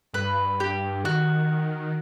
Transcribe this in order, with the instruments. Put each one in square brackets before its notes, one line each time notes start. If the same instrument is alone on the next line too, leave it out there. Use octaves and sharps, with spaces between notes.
[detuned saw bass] G2 [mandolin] B4
[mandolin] G4
[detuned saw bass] D#3 [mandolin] F#4